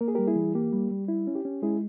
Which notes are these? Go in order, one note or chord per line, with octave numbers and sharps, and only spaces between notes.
A#3 A#4
G#4
G3 G4 A#4
E4 G#4
E3
A#3 G4
G3
G3
E4
C#4
G4
C#4
G#3 E4 G#4